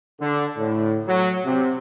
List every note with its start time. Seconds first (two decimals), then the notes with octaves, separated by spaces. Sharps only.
0.20 D3
0.57 A2
1.06 F#3
1.45 C3